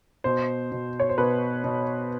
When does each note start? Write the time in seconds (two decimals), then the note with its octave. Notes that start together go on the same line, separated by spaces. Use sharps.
0.24 B2 C5
0.72 B2
1.00 C#5
1.09 C5
1.18 B2 B4
1.64 B2